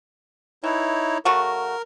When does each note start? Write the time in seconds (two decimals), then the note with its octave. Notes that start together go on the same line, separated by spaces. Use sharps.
0.64 E3 D#4 E4 C#5
1.25 C#3 A3 F#4 A#4